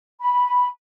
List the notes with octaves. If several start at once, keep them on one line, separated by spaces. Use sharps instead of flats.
B5